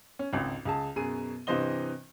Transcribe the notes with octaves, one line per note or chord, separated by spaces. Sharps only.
C#4
G#1 C#2
C#2 G#4 A5
F#2 B2 G#4 D#7
G2 C3 E3 C5 D#5 G7